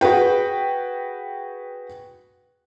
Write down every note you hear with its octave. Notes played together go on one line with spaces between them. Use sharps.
F#4 G#4 B4 G5